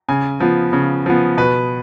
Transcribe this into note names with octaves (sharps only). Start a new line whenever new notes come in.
C#3 G#5
F3 B3
C#3
F3 B3
B2 B4